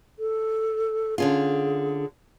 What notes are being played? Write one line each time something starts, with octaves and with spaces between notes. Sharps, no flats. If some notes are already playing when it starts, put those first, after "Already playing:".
A4
D3 C#4 F4 G#4